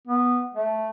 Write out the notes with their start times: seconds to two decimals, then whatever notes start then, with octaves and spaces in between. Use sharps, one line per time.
0.07 B3
0.54 A3